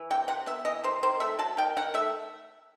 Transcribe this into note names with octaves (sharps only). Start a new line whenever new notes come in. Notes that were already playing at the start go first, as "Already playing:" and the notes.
Already playing: E3
C3 G5
C3 F#5
B3 E5
E3 D#5
C3 C5
D#3 C5
A3 E5
F#3 A5
D#3 G5
D#3 F#5
A3 E5